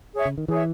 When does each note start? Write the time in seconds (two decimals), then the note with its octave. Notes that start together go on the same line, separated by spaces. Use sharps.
0.14 G#4 C#5 E5
0.25 C#3
0.38 D#3
0.48 E3 G#4 C#5 E5